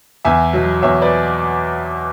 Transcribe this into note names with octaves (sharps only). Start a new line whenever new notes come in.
E2 E5 G#5
B2 F#3
E2 C#5 E5
B4 D5